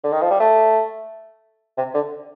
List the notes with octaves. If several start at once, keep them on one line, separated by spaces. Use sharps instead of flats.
D3
D#3
F3
G3
A3
C3
D3